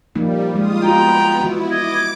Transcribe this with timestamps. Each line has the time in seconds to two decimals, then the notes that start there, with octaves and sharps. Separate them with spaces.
0.15 F3 G3 A#3 D#4
0.54 F3 G#3 F4 D#6
0.83 B3 F4 F#4 G5 A#5
1.40 E3 E4 F#4
1.71 D#5 D6 G#6 D7